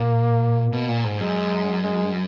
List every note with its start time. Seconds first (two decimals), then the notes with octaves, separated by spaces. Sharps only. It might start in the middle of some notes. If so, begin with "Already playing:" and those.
Already playing: A#2 A#3
0.73 B2
0.88 A#2
1.04 G#2
1.20 F#2 G#3
1.84 G#3